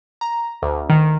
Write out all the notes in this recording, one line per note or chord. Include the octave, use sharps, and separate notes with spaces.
A#5
D2
D#3